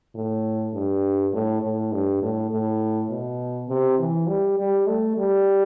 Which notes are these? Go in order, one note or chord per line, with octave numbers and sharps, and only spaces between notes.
A2
G2
A2
A2
G2
A2
A2
B2
C3
E3
G3
G3
A3
G3